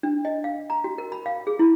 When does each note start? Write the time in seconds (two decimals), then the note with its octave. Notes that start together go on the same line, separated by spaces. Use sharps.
0.03 D4
0.25 D#5
0.44 F5
0.70 A#5
0.84 F#4
0.98 A#4
1.12 B5
1.26 F5
1.47 G#4
1.59 E4